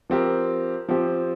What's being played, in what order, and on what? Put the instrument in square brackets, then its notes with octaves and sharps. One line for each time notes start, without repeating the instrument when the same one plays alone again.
[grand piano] F3 C4 G4 A#4
F3 C4 G4